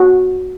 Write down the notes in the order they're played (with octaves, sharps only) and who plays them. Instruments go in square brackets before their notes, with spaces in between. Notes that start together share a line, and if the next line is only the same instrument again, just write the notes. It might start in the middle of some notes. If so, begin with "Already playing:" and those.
Already playing: [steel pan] F#4